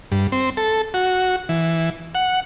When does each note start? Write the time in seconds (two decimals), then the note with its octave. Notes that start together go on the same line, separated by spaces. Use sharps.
0.12 G2
0.32 C4
0.57 A4
0.94 F#4
1.49 E3
2.15 F#5